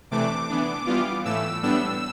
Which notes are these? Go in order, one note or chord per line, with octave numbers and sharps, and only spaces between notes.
C3 E3 A3 D4 D6
E3 B3 D4
E3 G3 B3 F4
A2 E3 A3 E6
A2 G3 B3 D4 E6